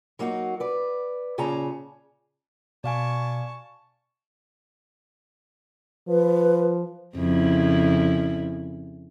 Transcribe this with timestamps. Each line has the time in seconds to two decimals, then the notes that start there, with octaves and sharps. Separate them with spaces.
0.19 F#3 A#3 D#4 F#4
0.60 B4 D5
1.38 A#2 C#3 G#4 C#5 A5 A#5
2.84 B2 D5 F5 G#5 A5 C#6
6.08 F3 B4
7.16 F2 C#3 E4